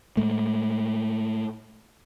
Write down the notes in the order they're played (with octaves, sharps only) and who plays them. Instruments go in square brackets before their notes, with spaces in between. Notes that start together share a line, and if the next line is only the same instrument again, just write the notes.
[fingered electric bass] A2 G#3 A3